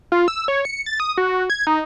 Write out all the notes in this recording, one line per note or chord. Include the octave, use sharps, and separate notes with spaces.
F4
E6
C#5
C#7
A6
D#6
F#4
G#6
D#4